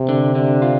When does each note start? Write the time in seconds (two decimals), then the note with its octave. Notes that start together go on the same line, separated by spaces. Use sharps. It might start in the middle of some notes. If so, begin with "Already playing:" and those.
Already playing: C3
0.09 D3
0.35 D3
0.62 F4